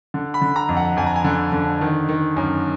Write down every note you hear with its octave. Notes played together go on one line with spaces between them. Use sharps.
D3
B5
D3
A#5
F2
F#5
F2 G#5
A#5
G#5
D3
D3
D#3
D#3
F#2